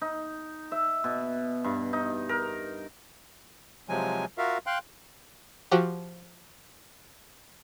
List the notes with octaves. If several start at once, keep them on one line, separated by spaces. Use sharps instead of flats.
D#4
E5
B2
G2
D#4
A#4
C3 F3 F#3 G#3 G#5
F4 F#4 A#4 E5 F5
F5 G5 C6 F#6
F3 F#4 G4